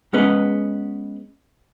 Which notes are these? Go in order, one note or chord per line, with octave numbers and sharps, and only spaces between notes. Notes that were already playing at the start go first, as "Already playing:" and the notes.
G#3 B3 C#4 G#4 B4 D#5